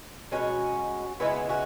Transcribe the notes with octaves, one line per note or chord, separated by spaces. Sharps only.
B2 G#3 C#4 F#4
C#3 E3 G#3 B3 E4
C#4 F#4